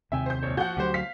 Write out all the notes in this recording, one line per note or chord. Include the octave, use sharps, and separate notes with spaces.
D#2 C3 E5 G5 G#5
C5 G6
A#1 C#5
F3 F#4 F#5 G6
D2 D#3 F#3 G4 C5
F5 B6